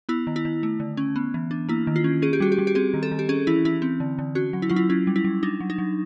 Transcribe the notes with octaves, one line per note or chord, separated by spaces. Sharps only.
B3 E4
D#3
E4
D#3
A3
D3
C#4
B3
E3
D4
A#3 E4
D#3
F4
C#4
C#4 G#4
G4
G3 F#4
G4
G3
G4
C4 G#4
D#3
A4
D#3
G4
C#4 G#4
E3 E4
E3 E4
C4
D3
D3
C#4 F#4
F#3
E4
F#3 F4
E4
C#4 E4
G3
E4
G3
D4 D#4
F#3
D#4
F#3